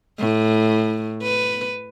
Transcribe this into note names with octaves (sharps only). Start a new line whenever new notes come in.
A2
B4